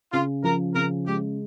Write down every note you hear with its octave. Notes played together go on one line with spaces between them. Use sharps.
C#3 F4
F3 A#4
C#3 A#4
G#3 G4